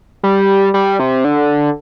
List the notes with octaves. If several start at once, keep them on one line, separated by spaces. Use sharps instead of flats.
G3
G3
C3
D3